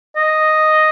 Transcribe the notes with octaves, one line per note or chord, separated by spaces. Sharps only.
D#5